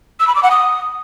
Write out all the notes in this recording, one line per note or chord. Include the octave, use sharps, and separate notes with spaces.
E6
B5
D6
F#5
D#6